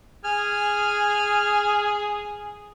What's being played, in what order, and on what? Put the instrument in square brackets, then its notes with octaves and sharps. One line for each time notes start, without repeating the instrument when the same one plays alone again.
[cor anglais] G#4 [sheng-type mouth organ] G#5 F6